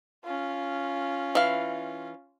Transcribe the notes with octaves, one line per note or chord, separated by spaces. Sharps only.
C#4 F4
E3 F5